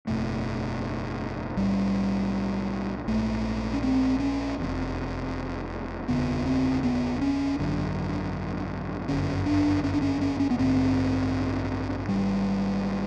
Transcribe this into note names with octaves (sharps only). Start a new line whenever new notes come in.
F#1 E2 B2 A3
B1 A2 G3
A#1 G#2 A3
C#4
C4
C#4
F1 E2 C3
F1 D#2 C#3 B3
C4
B3
C#4
G#1 F#2 D3
G1 F#2 D3 C#4
D4
C#4
D4
C#4
C#4
C#4
B3
A1 G2 D3 C4
G#1 G#2 G3